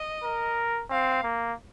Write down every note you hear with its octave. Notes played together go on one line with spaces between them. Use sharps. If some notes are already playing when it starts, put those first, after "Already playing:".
Already playing: D#5
A#4
C4 F5
A#3